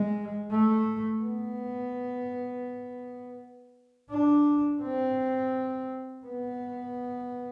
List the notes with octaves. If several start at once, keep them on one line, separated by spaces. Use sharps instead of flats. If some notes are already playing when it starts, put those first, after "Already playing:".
Already playing: G#3
A3
B3
D4
C4
B3